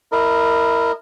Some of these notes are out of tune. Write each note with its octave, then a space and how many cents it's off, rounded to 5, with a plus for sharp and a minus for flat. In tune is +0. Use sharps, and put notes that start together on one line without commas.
E4 +0 A#4 -10 D#5 -25